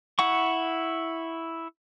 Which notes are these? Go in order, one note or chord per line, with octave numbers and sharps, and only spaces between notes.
E4 F#5 C#6